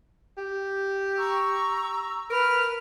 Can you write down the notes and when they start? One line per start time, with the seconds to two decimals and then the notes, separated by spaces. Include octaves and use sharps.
0.38 G4
1.17 A#5 C#6 E6
2.30 A#4 B4 F6